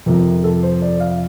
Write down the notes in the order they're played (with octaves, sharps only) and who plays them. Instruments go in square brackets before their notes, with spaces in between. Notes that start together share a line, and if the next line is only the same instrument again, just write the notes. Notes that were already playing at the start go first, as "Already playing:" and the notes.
[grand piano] F2 C3 F3 A#4
A4
C5
D5
F5